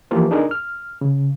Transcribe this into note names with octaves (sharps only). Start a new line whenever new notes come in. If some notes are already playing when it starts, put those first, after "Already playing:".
E3 F3 A#3 F4 G4
D4 D#4 G#4 A#4
F6
C#3